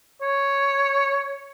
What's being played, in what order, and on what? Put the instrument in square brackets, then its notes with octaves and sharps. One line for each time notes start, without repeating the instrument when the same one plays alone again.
[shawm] C#5